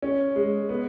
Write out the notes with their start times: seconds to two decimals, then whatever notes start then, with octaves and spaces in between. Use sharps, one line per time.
0.02 C#4
0.36 G#3
0.69 B3